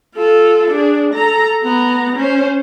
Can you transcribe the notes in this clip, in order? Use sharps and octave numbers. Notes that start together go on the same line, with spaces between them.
F4 A4
D4 G#4
A4 A#5
B3 A#5
C#4 C5